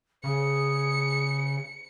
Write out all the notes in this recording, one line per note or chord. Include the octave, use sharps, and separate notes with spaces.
C#3 G#4 C#7